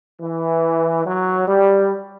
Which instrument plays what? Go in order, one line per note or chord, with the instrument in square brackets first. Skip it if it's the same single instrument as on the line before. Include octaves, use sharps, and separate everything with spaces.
[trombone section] E3
F#3
G3